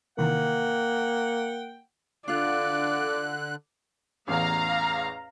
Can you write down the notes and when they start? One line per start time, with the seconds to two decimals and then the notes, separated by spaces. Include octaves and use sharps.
0.19 C3 D#3 E3 A#3 F#5 G5
2.28 D3 D4 F4 D5 F#6
4.28 A1 E2 F5 A#5